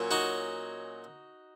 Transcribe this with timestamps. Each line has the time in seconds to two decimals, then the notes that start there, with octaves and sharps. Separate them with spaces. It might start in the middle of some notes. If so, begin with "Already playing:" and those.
Already playing: A#2 F#3 C#4
0.11 D#4 F#4